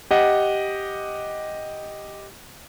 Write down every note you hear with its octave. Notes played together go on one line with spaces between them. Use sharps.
G4 D#5 F#5